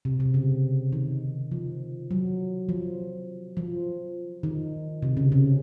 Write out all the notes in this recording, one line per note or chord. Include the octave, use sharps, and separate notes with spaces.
C3
C3
C#3
D#3
F3
F#3
F3
F3
D#3
C3
C#3
C#3